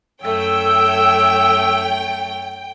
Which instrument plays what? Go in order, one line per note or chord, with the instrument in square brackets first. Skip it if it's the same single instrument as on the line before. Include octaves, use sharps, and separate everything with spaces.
[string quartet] F#2 A3 C#5 [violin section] G5 [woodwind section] E6